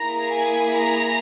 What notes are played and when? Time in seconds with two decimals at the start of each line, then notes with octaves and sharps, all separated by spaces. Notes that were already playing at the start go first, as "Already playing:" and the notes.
Already playing: A#3 E4 G#4 A#5
0.33 G#5
0.74 A#5